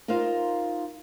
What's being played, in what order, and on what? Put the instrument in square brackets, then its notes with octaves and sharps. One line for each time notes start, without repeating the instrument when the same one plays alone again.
[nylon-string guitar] D#4 F4 A#4 C5 F5